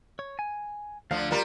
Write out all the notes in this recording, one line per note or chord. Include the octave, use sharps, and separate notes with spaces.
C#5
G#5
D2 D3 F3 F5
G3 F4 A#4